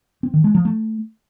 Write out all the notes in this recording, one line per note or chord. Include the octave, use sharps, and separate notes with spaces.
C4
D#3
G#3
F3
A3